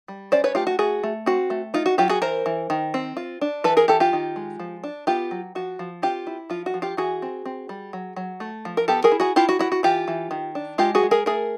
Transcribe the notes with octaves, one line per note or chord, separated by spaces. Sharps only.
G3
C#4 C5 D5
B4 C#5
A3 F4 G4
F#4
A3 F#4 G#4
A3
C4 F#4
A3
D#4 F4
F#4
F#3 F4 G4
F#4 G#4
E3 A#4 C5
E3
D#3
C4
F4
D4
E3 A4 B4
G#4 A#4
E3 G4 A4
F4 G4
D#3
G#3
F3
D4
B3 F4 G4
F#3
F3 F#4
F3
C4 F4 G4
E4
F3 F4
F#4
F3
F4 G4
E3 F#4 G#4
C4
C4
G3
F#3
F#3
A3
F3
A#4
B3 G4 A4
G#4 A#4
E4
F#4 G#4
E4 F4 G4
F#4
E4 F#4
F#4
E3 F4 G4
E3
D#3
D4
G#3 F4 G4
F#4 G#4
G#3
G#4 A#4
A3 G#4 A#4